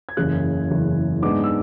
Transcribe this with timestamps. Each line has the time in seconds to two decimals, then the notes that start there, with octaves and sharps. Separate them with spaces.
0.09 G#6
0.17 F#1 E2 C#3 F#6
0.70 F#1 E2 C#3
1.22 G#2 G#3 B3 D4 D6
1.44 E6